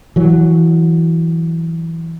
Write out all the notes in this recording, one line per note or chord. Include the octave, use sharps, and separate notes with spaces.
E3 F#3